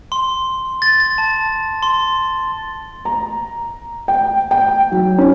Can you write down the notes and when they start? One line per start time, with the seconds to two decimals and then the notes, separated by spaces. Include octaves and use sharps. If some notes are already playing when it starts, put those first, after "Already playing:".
0.12 C6
0.82 A6
1.00 A6
1.18 A5
1.83 C6
3.05 A#5
4.08 G5
4.51 G5
4.92 F#3
5.18 C#4